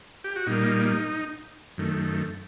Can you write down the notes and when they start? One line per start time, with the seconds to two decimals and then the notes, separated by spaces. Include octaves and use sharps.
0.24 G4
0.36 F#4
0.47 A#2 G3 A#3 D#4
1.78 F#2 D#3 A3